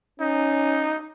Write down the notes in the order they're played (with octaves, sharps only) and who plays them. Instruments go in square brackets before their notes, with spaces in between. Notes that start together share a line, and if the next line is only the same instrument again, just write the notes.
[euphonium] C#4 [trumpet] D#4